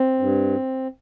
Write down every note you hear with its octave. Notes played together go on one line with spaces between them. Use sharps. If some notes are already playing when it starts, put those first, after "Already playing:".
Already playing: C4
G2